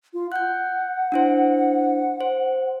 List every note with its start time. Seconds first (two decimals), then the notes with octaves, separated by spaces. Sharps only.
0.13 F4
0.32 F#5 F#6 G6
1.12 D4 E4 C5
2.21 C5